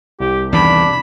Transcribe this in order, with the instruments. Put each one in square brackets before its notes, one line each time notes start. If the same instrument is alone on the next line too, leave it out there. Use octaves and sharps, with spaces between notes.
[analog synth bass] C2 [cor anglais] G4
[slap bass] E2 G2 D#3 [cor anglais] D4 [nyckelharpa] B5